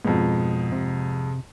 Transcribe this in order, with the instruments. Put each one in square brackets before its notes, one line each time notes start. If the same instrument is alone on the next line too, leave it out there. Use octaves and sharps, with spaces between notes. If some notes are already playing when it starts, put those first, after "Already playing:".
[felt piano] F2 G#2 [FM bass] B2
[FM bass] C3